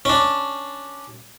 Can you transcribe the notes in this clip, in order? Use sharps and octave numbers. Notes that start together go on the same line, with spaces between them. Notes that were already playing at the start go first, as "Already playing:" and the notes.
C#4 D4